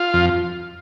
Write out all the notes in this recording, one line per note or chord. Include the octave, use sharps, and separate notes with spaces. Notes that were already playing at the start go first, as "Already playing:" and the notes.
Already playing: F4
F2